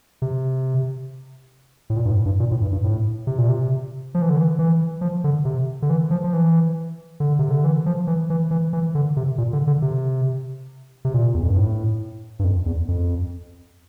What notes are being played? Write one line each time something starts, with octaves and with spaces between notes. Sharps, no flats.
C3
A2
A#2
G2
A2
G2
A#2
A2
G2
G2
A2
C3
A#2
C3
F3
E3
D3
E3
E3
F3
D3
C3
D3
E3
F3
F3
E3
D3
C3
D3
E3
F3
E3
E3
E3
E3
D3
C3
A#2
D3
D3
C3
C3
A#2
E2
F2
G2
A2
G2
F2
E2
F2